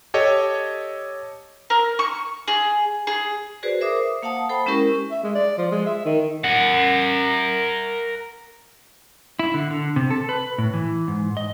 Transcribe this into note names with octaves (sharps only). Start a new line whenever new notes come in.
G4 A4 C#5 D#5
A#4
C#6
G#4
G#4
F#4 G#4 B4 C5 D5
A#4 C5 E5 D6 D#6
C5
A#3 F5 F#5 A5 D#6
A4 C5 G5 B5
G#3 C#4 E4 G4 A#4 C#6
E5
G#3
D5
F3
G#3
E5
D#3
A#4 F#5
E4
D3
D3
C3
A4
B4
A2
E3
G#2
D#5